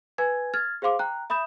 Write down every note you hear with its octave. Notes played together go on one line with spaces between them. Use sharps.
B4 G#5 G#6
F6 G#6 A6
G#4 C5 F5 C6 D6
G5 A#5 F#6
E5 B5 D#6 G6 E7